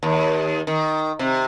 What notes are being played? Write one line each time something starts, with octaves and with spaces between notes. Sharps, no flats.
D#2
D#3
C3